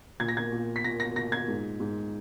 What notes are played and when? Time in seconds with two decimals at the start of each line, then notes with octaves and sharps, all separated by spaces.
0.20 A#2 G#6
0.28 A#6
0.37 G#6
0.52 A#2
0.76 B6
0.84 A#2 A#6
1.00 A#6
1.16 A#2 A#6
1.32 G#6
1.48 G#2
1.80 G#2